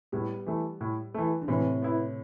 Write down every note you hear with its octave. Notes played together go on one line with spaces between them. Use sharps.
A2 G3 B3
E3 A3
A2
E3 A3
D3
A2 C3 E3
B3 E4